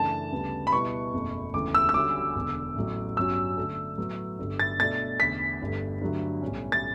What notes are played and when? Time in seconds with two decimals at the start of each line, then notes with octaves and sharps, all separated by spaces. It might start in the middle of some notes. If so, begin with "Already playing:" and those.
Already playing: F#2 C#3 E3 A3 D4 A5
0.32 D2 C#3 G3 B3
0.67 B5
0.72 B2 G3 B3 E4 C#6
1.13 F#1 E2 B2 A3
1.54 E1 D2 C#3 E3 D6
1.75 E6
1.89 E6
1.94 D3 G3 C#4 F#4 D6
2.36 E1 E2 D3
2.76 A1 A2 F#3
3.17 G1 G2 F#3 C#4 F#4 E6
3.57 D3 A3 D4 A4
3.98 A2 F#3 B3
4.39 G1 G2 D3
4.60 A6
4.80 B2 A3 D4 A4 D5 A6
5.20 E2 D3 A3 B6
5.61 G1 G2 D3 A3
6.01 G2 D3 F#3 A3
6.42 B1 A2 G3 C#4
6.72 A6